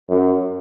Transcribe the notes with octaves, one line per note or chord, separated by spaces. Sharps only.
F#2